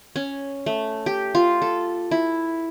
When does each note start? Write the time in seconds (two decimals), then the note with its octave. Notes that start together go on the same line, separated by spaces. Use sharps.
0.16 C#4
0.66 A3
1.06 G4
1.35 F4
1.62 A4
2.11 E4